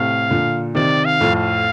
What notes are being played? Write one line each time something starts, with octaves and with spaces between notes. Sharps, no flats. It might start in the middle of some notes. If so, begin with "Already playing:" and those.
Already playing: A2 C3 F5
A#2 D3
C3 D#3 D5
F5
F2 A2
F5